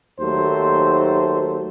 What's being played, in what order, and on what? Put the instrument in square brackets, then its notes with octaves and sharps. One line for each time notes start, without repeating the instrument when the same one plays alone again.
[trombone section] D#2 F#3 A3 C5